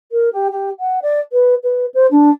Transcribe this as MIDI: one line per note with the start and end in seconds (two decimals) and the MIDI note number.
0.12 0.29 70
0.33 0.48 67
0.51 0.70 67
0.80 1.00 78
1.02 1.21 74
1.33 1.55 71
1.63 1.86 71
1.94 2.07 72
2.11 2.30 62